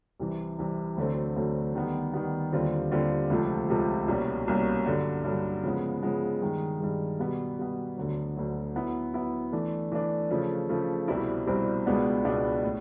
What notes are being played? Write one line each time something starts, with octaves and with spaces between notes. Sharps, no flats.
C2 C3 E3
C2 C3 E3
D2 D3 F#3 A3 C4
D2 D3 F#3 A3 C4
D#3 G3 B3
D#3 G3 B3
D#2 D3 G3 C4 F4
D#2 D3 G3 C4 F4
C#2 C3 F3 A3
C#2 C3 F3 A3
C2 B2 G3 A#3 C#4
C2 B2 G3 A#3 C#4
G2 D3 F#3
G2 D3 F#3
C#3 F3 G#3 B3
C#3 F3 G#3 B3
G2 D#3 G#3
G2 D#3 G#3
B2 G3 B3
B2 G3 B3
D2 D3 F#3
D2 D3 F#3
F#3 B3 E4
F#3 B3 E4
E3 A3 D4
E3 A3 D4
C#3 F3 A3
C#3 F3 A3
C2 B2 G3 C4 E4
C2 B2 G3 C4 E4
C#2 B2 G#3 B3 D4
C#2 B2 G#3 B3 D4
A2